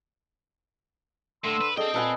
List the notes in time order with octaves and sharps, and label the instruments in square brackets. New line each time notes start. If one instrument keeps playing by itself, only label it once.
[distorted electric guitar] A2 [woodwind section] D3 C6 E6
[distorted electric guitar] B4
[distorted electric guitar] C4 G5 [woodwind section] D4 G#4 A4 [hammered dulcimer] D#5
[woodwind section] A#2 [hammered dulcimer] A4 B4 G#5